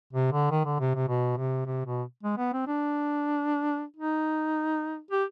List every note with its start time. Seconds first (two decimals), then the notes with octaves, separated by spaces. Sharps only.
0.13 C3
0.32 D3
0.51 D#3
0.65 D3
0.80 C3
0.95 C3
1.08 B2
1.37 C3
1.66 C3
1.86 B2
2.23 G#3
2.37 B3
2.53 C4
2.67 D4
3.97 D#4
5.11 G4